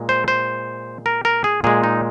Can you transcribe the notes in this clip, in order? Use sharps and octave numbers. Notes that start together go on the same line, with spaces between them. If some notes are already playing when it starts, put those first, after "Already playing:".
Already playing: A#2 G#3
C5
C5
A#4
A#4
G#4
A#2 G#3 G#4
D#4